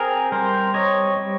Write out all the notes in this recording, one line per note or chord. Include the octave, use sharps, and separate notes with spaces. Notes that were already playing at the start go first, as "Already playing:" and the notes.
Already playing: C4 G#4 A#4
G3 A#4 C5
C4 C#5 D#5
G3